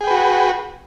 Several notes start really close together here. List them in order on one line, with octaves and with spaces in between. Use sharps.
G#4 G5 B4 F#4